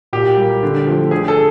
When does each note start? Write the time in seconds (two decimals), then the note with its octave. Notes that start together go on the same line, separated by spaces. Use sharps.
0.13 A#2 G4
0.37 G3 A#3
0.63 D3
0.87 F3 A3
1.11 D3 G#4
1.28 A4